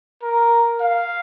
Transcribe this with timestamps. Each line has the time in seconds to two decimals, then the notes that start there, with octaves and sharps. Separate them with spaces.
0.23 A#4
0.81 F5